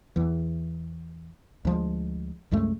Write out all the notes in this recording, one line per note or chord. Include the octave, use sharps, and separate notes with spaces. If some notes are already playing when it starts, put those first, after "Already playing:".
E2 E3
D2 F3 G#3
C2 F#2 G#3 A3